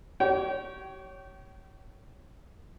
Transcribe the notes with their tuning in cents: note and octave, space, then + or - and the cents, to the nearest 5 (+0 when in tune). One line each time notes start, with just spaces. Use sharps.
G4 -40 C#5 +0 G5 -25